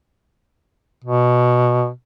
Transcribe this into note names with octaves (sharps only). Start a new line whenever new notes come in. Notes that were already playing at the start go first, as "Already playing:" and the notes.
B2